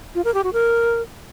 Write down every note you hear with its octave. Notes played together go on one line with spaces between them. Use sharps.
F4
A#4
G4
F#4
A#4